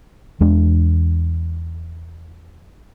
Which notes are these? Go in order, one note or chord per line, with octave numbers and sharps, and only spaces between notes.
E2 G#3 D4